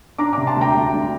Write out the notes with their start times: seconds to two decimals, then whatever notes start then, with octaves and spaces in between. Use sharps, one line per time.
0.18 D4 A#5 D6
0.33 C3 A#5 D6
0.47 A5 C6
0.56 D2 G5 A#5
0.74 D2
0.93 D4